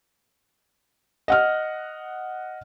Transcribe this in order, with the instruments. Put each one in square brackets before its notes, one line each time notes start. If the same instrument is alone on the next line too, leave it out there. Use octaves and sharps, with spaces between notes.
[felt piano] D#5 F#5 F6